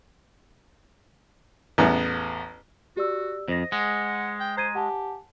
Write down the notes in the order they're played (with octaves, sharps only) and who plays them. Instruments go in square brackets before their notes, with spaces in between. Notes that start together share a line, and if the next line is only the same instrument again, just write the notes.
[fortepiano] A1 E2 B3
[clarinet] F#4 [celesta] G4 D5 E6
[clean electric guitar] F2 [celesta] C5 A#6 [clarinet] D#5
[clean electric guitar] G#3 [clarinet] F#5
[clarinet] G5
[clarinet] C5 [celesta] A#5 G#6 D#7
[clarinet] G4 [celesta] F#5 G#5 A5